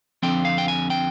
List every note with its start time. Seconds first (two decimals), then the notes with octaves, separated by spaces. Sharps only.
0.23 F2 D3 F3 C4 G5
0.45 F5
0.58 G5
0.68 G#5
0.90 G5